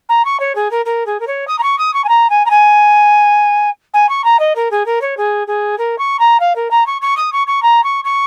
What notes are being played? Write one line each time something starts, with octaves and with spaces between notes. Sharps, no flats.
A#5
C#6
C#5
G#4
A#4
A#4
G#4
A#4
C#5
D#6
A#5
C#6
D#6
C#6
G#5
A#5
G#5
A#5
G#5
G#5
C#6
A#5
D#5
A#4
G#4
A#4
C#5
G#4
G#4
A#4
C#6
A#5
F5
A#4
A#5
C#6
C#6
D#6
C#6
C#6
A#5
C#6
C#6